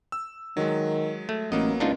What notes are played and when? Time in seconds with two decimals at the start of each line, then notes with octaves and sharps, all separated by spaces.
0.12 E6
0.57 D#3 F#3 G#3
1.29 A3
1.52 A1 F#3 A#3 B3 D#5
1.80 C#2 D4 D#4 F4